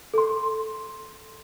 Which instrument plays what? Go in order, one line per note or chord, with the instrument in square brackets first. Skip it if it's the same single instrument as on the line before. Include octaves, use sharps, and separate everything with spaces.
[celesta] A4 C6